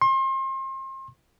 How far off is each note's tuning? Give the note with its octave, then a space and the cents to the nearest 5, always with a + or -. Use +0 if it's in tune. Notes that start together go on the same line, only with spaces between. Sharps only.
C6 +35